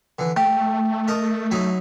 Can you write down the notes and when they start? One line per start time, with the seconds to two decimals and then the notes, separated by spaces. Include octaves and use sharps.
0.19 D3 E3
0.36 A3 G4
1.08 A#4 D#5 A5
1.51 F#3 D#4 E4